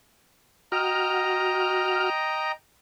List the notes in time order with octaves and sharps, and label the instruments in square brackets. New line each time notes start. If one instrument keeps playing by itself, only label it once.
[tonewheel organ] F#4 F6 [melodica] D#5 G5 A#5